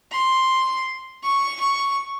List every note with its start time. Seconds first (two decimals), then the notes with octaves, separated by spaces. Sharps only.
0.12 C6
1.23 C#6
1.60 C#6